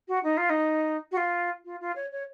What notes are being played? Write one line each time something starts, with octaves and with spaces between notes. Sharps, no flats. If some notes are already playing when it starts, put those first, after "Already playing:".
F#4
D#4
F4
D#4
F#4
F4
F4
F4
C#5
C#5